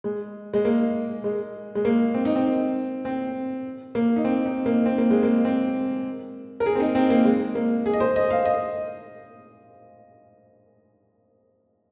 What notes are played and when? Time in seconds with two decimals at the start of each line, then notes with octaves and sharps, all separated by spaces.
0.04 G#3
0.53 G#3
0.65 A#3
1.24 G#3
1.75 G#3
1.85 A#3
2.14 C4
2.25 D#4
2.35 C4
3.05 C4
3.95 A#3
4.16 D#4
4.25 C4
4.46 D#4
4.66 A#3
4.86 C4
4.98 A#3
5.11 G#3
5.23 A#3
5.45 C4
6.60 A#4
6.66 G#4
6.75 C4
6.80 D#4
6.95 C4
7.10 A#3
7.25 G#3
7.55 A#3
7.86 G#4
7.93 D#5
8.00 C5
8.16 D#5
8.30 F5
8.45 D#5